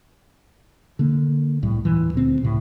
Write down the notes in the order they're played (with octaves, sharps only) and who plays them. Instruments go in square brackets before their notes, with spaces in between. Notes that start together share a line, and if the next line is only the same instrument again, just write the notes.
[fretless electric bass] D3 A#3
C2 A2 G3
D#2 A#2 E3
D2 C4
C#2 A2 C3